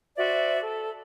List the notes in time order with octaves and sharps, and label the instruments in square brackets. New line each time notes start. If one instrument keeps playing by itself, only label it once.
[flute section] F#4 C5 D5 E5
A4